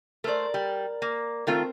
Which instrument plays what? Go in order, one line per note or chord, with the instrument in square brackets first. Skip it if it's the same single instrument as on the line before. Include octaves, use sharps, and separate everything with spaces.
[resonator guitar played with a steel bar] A3 C5 [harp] A#4 D5
[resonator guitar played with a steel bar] G3
A#3
[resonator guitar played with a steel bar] D#3 A3 F4 [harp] C4 A#4